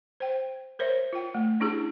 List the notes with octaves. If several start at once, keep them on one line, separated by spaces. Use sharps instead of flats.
C5 G5
A#4 C5 C#5 E5
F4 G5
A3
C#4 D4 E4 G4 G#4